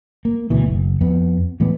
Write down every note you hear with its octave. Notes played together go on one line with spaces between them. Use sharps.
A#3
D2 B2 E3
F#1
F2 B3
A2 E3 G#3 B3